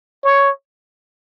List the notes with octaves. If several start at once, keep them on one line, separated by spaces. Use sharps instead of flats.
C#5